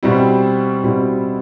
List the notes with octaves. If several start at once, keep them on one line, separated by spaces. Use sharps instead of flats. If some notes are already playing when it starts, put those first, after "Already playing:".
B2 G3 C4 E4
B2 G3 C4 E4